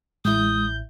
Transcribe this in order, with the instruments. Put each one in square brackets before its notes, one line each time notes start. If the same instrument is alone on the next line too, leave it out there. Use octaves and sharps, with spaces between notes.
[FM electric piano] A1 E4 [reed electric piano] G#3 [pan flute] D#6 [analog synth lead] G6